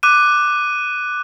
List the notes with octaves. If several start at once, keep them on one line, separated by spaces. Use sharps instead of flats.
D6 F#6 D#7